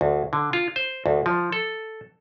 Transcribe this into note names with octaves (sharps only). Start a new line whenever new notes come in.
D2
D3
F4
C5
D2
F3
A4